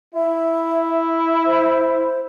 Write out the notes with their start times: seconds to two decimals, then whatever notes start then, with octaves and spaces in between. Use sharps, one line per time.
0.14 E4 E5
1.46 C5